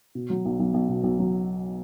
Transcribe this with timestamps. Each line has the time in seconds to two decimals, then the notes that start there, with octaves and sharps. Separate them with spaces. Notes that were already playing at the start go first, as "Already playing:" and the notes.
0.15 B2
0.30 F#3
0.45 B1
0.60 B1
0.74 B1
0.89 B2
1.04 B1
1.19 F#3